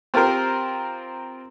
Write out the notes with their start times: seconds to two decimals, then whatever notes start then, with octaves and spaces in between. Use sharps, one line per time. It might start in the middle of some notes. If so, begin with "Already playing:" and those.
0.14 C4 F4 G4 A#4 C5